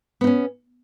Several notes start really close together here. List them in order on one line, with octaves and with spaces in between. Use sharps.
B3 D#4 C#4